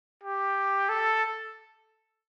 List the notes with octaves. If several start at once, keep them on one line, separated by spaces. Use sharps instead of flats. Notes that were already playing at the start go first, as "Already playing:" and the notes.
G4
A4